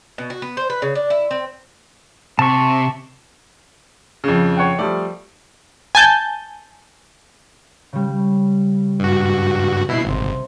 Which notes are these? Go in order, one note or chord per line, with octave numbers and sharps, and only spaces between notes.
B2
F#4
B3
C5
B4
C#3
D4
E4
C4
C3 A5 C#6
F2 C#3
C#5 F#5 G5
F3 G3 A3 D5
G#5 A5 G6
C#3 G3
G2 F#4
B2 E4 C7
G#1 C3 C4